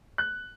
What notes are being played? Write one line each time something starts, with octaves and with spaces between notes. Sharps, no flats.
F#6